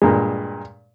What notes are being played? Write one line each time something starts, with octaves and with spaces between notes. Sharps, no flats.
G2 A#2 G#3